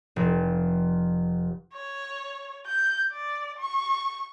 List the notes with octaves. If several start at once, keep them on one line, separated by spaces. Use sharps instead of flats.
F1
C#5
G6
D5
C#6